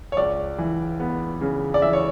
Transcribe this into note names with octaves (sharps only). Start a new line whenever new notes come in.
C#5
C#2 D5
E3
B3
C#3
D5
E3 E5
C#5